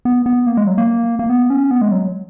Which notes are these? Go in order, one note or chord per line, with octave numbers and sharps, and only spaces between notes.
B3
B3
A#3
G#3
F#3
A#3
A#3
B3
C#4
B3
G#3
F#3